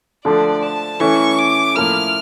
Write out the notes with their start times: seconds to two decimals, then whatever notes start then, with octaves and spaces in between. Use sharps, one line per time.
0.25 D3 F3 A3 D4 D5
0.63 A5
1.00 E3 A3 C#4 E4 C#6
1.38 D6
1.75 A2 F3 A#3 E4 F6